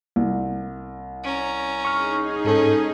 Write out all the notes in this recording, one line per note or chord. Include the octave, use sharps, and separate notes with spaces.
C2
C#4 A#5
D#4 G#4 C#6 F6
G#2 C#4 A4